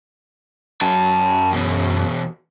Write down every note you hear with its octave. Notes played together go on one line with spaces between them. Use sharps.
F#2 G5 A5
E2 B2